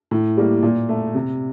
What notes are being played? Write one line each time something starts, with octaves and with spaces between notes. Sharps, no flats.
A2
G3 A#3
A#2
A3
C3